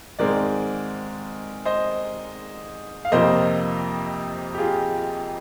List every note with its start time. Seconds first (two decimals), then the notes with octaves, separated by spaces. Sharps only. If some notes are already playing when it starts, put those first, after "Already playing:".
0.19 G#2 D#3 G#3 C4 A#4 D5
1.65 C5 D#5
3.05 F5
3.12 F2 C3 F3 A#3 C5 D#5
4.54 G4
4.58 F4 G#4